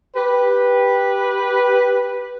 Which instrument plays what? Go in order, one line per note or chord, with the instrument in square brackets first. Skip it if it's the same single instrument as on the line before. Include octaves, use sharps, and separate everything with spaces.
[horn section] G4 B4